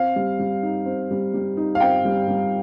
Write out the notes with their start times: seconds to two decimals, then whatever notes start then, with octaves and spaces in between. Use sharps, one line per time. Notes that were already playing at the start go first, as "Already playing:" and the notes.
Already playing: C4 F5
0.16 G3
0.39 G3
0.63 D#4
0.86 C4
1.11 G3
1.34 G3
1.57 D#4
1.75 F5
1.80 C4 G5
2.05 G3
2.28 G3